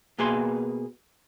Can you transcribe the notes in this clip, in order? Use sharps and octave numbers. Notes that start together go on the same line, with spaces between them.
B2 A#3 G#4 B4 C6